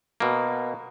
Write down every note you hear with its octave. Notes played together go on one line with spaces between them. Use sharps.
B2 A#3